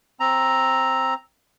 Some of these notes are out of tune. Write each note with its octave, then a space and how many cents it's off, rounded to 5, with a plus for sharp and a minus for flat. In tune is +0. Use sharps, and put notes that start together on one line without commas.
C4 +10 A#5 +0